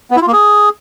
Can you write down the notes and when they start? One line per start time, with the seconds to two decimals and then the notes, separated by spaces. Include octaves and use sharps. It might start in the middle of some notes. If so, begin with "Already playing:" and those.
0.11 B3
0.16 E4
0.22 F4
0.27 A#3
0.33 G#4